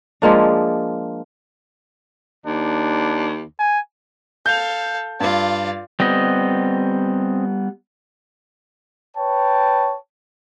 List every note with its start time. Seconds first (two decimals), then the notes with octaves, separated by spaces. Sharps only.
0.22 F3 G#3 A#3 D4
2.46 D#2 D4
3.59 G#5
4.46 A4 F5 G6 F7
5.20 G2 F4 D5
6.00 G3 B3 C4 D#5
9.16 B4 C#5 G5 A5